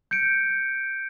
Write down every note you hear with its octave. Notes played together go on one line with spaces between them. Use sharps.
G6 C#7 D7